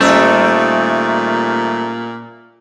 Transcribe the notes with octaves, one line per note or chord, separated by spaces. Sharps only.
A#2 D#3 G3 A3 C#4 C5 E5 E6